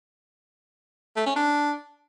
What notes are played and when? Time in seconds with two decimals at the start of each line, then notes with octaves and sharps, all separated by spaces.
1.16 A3
1.26 C#4
1.36 D4